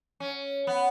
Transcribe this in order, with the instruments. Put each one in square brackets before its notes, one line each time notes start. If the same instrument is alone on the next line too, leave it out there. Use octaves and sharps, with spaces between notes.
[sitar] C#4
B3